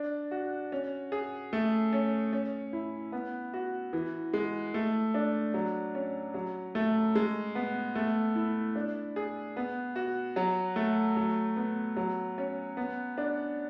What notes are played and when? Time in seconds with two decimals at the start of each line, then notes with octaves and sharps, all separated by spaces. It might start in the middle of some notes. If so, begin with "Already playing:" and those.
Already playing: D4
0.31 F#4
0.72 C#4
1.12 G#4
1.53 A3
1.93 C#4
2.33 C#4
2.73 E4
3.12 B3
3.54 F#4
3.93 E3
4.33 G#3
4.74 A3
5.14 D4
5.54 F#3
5.95 C#4
6.34 F#3
6.75 A3
7.15 G#3
7.55 B3
7.95 A3
8.35 E4
8.76 D4
9.16 G#4
9.56 B3
9.96 F#4
10.36 F#3
10.76 A3
11.16 F#3
11.56 B3
11.96 F#3
12.38 C#4
12.77 B3
13.18 D4